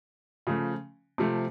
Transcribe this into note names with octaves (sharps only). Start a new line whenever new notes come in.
C#3 F3 A3
C3 F3 A3